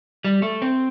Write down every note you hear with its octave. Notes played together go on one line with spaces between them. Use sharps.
G3
A3
C4